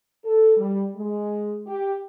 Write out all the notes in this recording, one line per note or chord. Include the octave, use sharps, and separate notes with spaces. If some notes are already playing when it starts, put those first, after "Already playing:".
A4
G3
G#3
G4